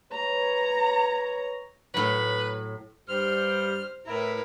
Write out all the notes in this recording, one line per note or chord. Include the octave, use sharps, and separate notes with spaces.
B4 C#5 A#5
A2 F#3 B4
G2 G3 C5 F6
A2 E4 A#4 B4